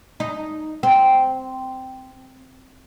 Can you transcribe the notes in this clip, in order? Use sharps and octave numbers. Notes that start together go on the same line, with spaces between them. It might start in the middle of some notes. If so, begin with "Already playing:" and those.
D#4
C4